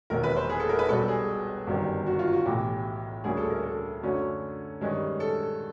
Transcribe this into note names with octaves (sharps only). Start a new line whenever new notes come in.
E1 D#2 D#3 A#4
B4
C5
G#4
A4
A#4
B4
B1 B2 G3 A4
G#4
G1 F#2 D#3 G3 C4
F#4
F4
F#4
B1 A2 E3 G4
D2 D3 G3 A#3 C#4 G#4
A4
A#4
A4
F#2 D3 F#3 A3 C#4
G2 D#3 G#3 C#4
A4